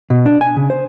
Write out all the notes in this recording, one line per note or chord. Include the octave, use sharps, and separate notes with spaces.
B2
D4
G#5
C#3
C5